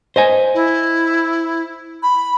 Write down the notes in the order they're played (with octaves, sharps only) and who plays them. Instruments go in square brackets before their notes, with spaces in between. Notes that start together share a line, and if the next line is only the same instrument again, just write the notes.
[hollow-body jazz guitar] C5 D#5 G#5
[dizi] E4
B5